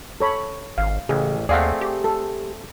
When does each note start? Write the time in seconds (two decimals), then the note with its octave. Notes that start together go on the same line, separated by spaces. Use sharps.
0.20 A4 C#5 B5
0.78 G#1 F5
1.09 A1 C#3 G#4
1.49 D#2 A3 C4 G#4 D5 F5 F#5
1.81 G4
2.04 A4